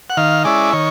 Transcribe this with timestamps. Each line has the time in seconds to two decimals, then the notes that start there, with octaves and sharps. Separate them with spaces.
0.10 F#5
0.17 D#3 F5
0.44 G#3 C#4 E4 D5
0.73 D#3 C#5